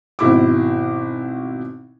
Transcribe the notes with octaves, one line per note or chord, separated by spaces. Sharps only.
G#1 B2 E4 D6